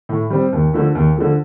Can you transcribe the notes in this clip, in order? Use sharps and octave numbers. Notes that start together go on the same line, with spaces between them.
A2
G3 C4
D#2
D3 F3 A3
D#2
D3 F3 A3